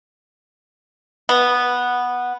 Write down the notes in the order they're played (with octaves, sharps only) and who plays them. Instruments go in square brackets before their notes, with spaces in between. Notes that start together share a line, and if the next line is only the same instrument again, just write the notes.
[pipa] B3